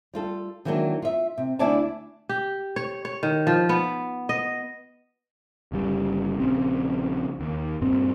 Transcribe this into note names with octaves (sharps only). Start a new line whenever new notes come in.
G3 F4 A4
D#3 E3 F#3 G#3 A#3 D4
F4 E5
C3
D2 D4 E4 D5 G#5 A5
G4
C#5
C#5
D#3
F3
B3
D#5
G1 C#3 G3
A#1 C#3 C4
D#2
G2 A#2 C4